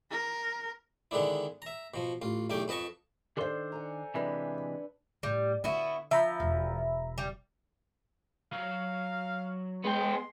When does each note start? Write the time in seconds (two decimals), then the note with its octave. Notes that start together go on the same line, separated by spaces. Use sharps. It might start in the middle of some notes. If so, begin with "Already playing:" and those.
0.10 A#4
1.11 D3 D#3 G#3 B3 D4 E4
1.62 E5 A#5
1.94 B2 F3
2.22 A1 F4
2.50 B1 E2 A3 G4 G5
2.68 F2 B4 D#5 A5 C#6
3.37 D#3 D4 A4 C5 D5 C6
3.72 F#5 G#5 A#5
4.14 C3 E3 G#3 D4 B4 E5
5.23 A2 G3
5.64 D3 B3 E4 F#4
6.11 F3 E5 A#5 B5
6.40 E1
7.18 G3
8.52 F#3 F5
9.84 G#3 B3 G5 C6